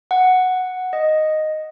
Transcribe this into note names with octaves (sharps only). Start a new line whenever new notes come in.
F#5
D#5